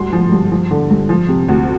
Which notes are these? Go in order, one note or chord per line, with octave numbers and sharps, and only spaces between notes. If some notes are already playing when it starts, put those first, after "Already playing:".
Already playing: D2 G2 C6
F3
G2
F3
D3
G2
F3
C3
D2